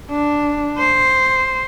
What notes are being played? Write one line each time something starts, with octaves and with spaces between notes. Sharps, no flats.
D4
C5